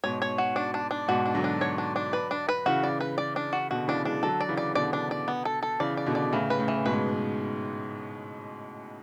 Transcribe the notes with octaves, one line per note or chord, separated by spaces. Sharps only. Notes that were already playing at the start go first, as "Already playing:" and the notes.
G#2 B2 C#5
C#5
F#4
D4
D4
D4
G#2 B2 F#4
D4
D3 F#3
D4
C#5
D4
D4
B4
D4
B4
C#3 E3 F#4
D5
B4
D5
D4
F#4
B2 D3 F#4
C#3 E3 D4
E3 G#3 D4
D3 F#3 A4
D5
C#3 E3
D5
B2 D3 D5
D4
D5
B3
A4
A4
C#3 E3 D5
D5
B2 D3
D5
A2 C#3 E3
B4
A2 C#3
E3
G#2 B2 B4
G#3